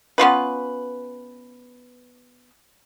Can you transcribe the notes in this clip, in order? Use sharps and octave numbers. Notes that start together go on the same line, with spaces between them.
B3 C#4 F4 B4